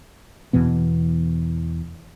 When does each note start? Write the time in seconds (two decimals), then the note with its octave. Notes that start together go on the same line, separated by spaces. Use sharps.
0.53 E2 B2 E3 B3